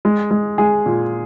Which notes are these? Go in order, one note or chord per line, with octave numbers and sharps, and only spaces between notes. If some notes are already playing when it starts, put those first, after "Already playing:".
G#3
G#3
G#3 G#4
A#2